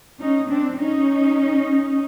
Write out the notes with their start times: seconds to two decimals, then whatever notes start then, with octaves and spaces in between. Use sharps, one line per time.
0.20 C#4 D#4
0.50 C4 D4
0.79 C#4 D#4